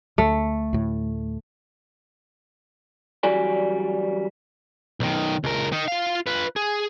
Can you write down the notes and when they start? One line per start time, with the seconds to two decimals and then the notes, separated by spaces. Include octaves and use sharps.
0.18 D2 A3
0.73 D2 A2
3.23 F#2 E3 G3 F#4 D5 G#5
5.00 B1 D#3
5.44 C#2 A#4
5.72 D#3 D#4
5.88 F4 F5
6.27 F4 B4
6.56 G#4